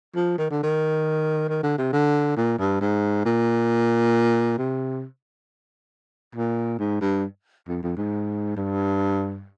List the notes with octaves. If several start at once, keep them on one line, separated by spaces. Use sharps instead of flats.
F3
D#3
D3
D#3
D#3
D3
C3
D3
A#2
G2
G#2
A#2
C3
A#2
G#2
G2
F2
F2
G#2
G2